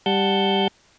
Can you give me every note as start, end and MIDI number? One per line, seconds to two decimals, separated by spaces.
0.06 0.68 55
0.06 0.68 78
0.06 0.68 81
0.06 0.68 91